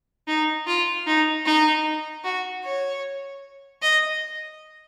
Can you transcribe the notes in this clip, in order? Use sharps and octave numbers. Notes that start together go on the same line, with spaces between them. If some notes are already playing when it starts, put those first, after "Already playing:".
D#4
F4
D#4
D#4
F#4
C#5
D#5